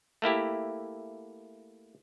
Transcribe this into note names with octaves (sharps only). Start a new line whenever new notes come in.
A3 A#3 E4 G4